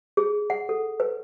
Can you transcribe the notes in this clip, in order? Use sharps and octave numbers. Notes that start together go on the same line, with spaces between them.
G#4
F#5
A4
B4